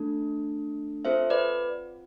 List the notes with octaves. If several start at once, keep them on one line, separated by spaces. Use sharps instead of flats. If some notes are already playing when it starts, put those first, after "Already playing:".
Already playing: A3 D4 A4
C4 F4 A4 C5 E5
B4 D5